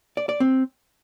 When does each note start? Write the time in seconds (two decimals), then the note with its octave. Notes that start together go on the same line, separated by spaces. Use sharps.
0.17 D5
0.29 D5
0.40 C4